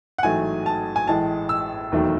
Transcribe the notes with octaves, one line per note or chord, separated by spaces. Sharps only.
F#5
A1 G#2 F#3 A3 G#5
A5
G#5
A1 A2 G#3 A5
E6
E1 D#2 D#3 F#3 A3